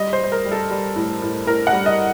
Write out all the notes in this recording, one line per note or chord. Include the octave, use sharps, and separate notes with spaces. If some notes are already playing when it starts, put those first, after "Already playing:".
Already playing: G3 D#5
C5
G3
C5
A#4
G3
A4
G3
A2
A2
A2 A#4
F#5
G3
D#5